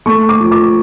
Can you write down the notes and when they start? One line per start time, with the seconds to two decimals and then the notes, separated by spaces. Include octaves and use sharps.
0.06 A3 C#6
0.29 D6
0.40 F3
0.51 D6